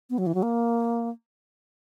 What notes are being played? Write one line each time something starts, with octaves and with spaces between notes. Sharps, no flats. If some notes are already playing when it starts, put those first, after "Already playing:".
B3
F#3
E3
F#3
A#3